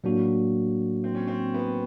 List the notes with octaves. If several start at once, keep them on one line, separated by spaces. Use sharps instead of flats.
A2 F#3 A#3 D4 F#4
C4
C#4
C4
B3